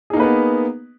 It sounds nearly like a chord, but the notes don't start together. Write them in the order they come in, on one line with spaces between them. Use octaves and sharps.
G#4 D#4 A#3 B4 B3